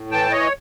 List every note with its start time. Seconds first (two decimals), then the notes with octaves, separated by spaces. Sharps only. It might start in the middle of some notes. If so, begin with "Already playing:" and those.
Already playing: A2
0.11 E3 G5 A5
0.31 E3 C#5 D#5